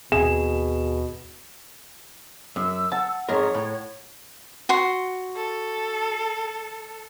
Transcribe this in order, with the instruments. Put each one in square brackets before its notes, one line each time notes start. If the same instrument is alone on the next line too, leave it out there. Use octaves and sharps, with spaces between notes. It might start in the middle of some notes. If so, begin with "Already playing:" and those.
[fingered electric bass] D#2 C4 [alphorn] B2 [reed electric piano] G#4 [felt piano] E7
[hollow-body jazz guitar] F#2 [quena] E6
[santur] F#5 [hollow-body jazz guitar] A5
[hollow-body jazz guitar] F2 G#2 A#4 [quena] C#5
[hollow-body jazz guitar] A2
[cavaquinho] F#4 C6
[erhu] A4